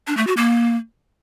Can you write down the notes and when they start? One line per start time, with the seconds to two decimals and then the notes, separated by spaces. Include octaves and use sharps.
0.07 D4
0.17 A3
0.27 F#4
0.37 A#3